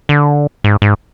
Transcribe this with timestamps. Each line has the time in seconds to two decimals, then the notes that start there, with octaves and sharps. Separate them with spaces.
0.09 D3
0.64 G#2
0.82 G#2